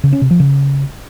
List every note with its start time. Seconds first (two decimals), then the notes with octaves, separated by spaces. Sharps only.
0.04 C#3
0.13 C#4
0.22 C3
0.31 F3
0.40 C#3